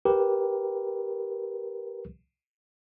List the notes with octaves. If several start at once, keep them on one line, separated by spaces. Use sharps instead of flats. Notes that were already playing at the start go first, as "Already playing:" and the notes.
G4 A#4 B4